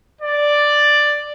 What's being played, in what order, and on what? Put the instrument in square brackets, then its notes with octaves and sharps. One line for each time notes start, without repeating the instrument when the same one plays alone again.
[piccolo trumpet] D5